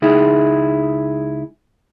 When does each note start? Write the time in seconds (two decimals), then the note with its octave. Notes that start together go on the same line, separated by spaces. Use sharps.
0.02 C#2 D#4 E4 G#4